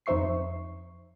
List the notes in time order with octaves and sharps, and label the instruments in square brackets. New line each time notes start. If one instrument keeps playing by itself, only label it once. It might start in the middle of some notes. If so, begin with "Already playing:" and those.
[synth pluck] F2 D#4 C5 E5 C#6 C7